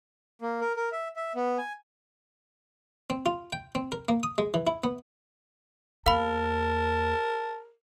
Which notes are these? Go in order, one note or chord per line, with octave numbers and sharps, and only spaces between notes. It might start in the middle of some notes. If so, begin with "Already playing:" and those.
A#3
A#4
A#4
E5
E5
B3
G#5
C4
F4
G5
C4
A#4
A#3
D#6
G#3
E3
E4
B3
E2 A#3 A#4 F5 A5 B5